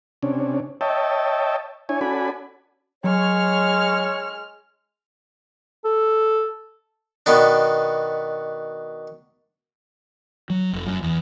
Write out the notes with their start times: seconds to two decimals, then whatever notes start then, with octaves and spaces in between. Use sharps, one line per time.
0.23 C3 C#4 D4
0.81 C#5 D#5 E5 G5 A5
1.89 D4 E4 C#5 G#5
2.01 C#4 F#4 A4 D5 G#5 B5
3.04 F#3 G#3 C#5 F6
5.84 A4
7.26 B2 D#3 B3 D4
10.50 F#3
10.73 F1
10.86 F#2
11.03 E2